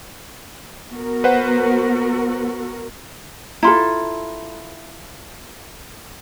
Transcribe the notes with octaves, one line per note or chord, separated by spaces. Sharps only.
B3 F#4 A#4
B4 C5 F#5
E4 F4 A4 A#5 C6